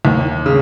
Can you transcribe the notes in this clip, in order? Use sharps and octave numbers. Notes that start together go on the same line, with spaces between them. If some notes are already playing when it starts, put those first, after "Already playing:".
D#2
C#3